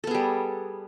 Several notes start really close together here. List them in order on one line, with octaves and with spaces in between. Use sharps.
A4 B3 G#4 G3